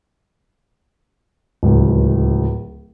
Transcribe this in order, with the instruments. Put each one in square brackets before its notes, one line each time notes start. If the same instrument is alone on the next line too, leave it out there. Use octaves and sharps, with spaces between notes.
[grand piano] D1 C#2